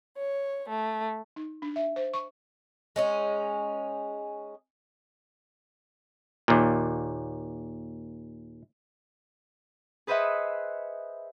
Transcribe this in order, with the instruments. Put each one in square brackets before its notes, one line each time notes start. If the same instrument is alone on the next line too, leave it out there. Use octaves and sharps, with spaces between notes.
[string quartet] C#5
A3
[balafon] D#4
D4
E5
C5
C#6
[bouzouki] G#3 C#4 D#4
[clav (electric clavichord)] D#2 A#2
[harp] G#4 B4 C5 D#5 E5 F#5